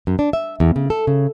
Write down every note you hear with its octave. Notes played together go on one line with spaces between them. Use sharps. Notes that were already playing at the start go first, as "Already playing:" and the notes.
F#2
D4
E5
E2
C#3
A4
C#3